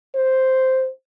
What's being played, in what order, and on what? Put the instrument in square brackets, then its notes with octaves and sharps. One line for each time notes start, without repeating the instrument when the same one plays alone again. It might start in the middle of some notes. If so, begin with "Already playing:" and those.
[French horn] C5